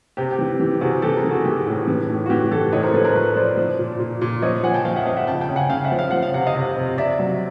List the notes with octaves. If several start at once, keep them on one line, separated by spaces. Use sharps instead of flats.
C3 G4
G4
E3
E3 G4
C3 F#4 G#4
E3 G4 A4
G#4 A#4
E3
F#4 G#4
E3 G4
A2
E3
A2
F#4
E3 G4
E3 G4 A4
A2 C#5 D#5
A#4 C5
F3 A4 B4
A#4 C5
F3 B4 C#5
F3 C5 D5
F3
A#2
A#2
A#2
F3 C#5 D#5
F3 F#5 G#5
G5 A5
F3 F5 G5
E5 F#5
F3 D#5 F5
E5 F#5
C#3 G5 A5
G5 A5
C#3
F#5 G#5
C#3 F5 G5
E5 F#5
F3
F5
F3 F#5
F5
C3 F#5
D#5 F5
C3
C3
C3 D5 E5
F#3